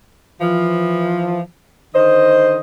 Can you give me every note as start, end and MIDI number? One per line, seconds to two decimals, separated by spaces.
0.41 1.41 52
0.41 1.41 53
1.95 2.58 50
1.95 2.58 51
1.95 2.59 72
1.95 2.58 75